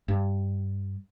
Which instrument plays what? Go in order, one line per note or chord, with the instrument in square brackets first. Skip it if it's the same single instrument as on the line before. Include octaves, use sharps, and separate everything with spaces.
[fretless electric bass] G2